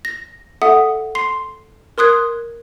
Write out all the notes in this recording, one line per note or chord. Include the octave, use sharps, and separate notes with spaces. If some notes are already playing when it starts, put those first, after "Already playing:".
A#6
A4 E5 F#5 D#6
C6 C7
A#4 C6 D#6 F#6 G#6